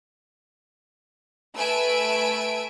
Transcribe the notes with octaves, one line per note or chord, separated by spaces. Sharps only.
A3 B4 E5 G#5 E6 D7